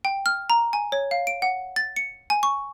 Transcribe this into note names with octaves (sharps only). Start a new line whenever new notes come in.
G5
F6
A#5
G#5
C#5
F5
D7
F#5
A6
C#7
G#5
C#6